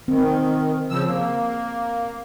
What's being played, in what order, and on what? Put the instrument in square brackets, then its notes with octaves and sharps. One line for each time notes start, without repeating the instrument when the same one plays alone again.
[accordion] D#3 [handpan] C4
[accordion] C#3 F3 E6
A#3